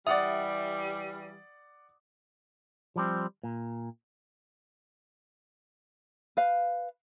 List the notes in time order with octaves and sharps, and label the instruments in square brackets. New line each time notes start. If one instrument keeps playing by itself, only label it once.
[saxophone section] E3 G3 [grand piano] D5 F#5 D#6 [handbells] E5
[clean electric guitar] F3 G3 C4
A#2
[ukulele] B4 F5